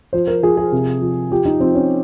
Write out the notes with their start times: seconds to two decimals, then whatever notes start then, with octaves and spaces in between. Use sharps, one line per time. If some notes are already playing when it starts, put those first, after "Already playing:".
0.13 F3 C5
0.27 A#4
0.43 F3 G#4
0.57 G#4
0.72 C3
1.01 F3
1.31 F3 G4
1.45 D#4
1.60 F3 C4
1.75 C#4